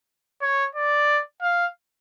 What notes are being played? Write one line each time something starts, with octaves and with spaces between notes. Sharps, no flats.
C#5
D5
F5